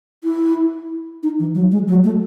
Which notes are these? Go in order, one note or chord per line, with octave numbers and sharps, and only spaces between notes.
E4
D#4
E3
F#3
G#3
F#3
A3